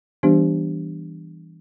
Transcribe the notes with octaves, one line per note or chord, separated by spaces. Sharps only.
E3 G3 B3 D4 G4 C5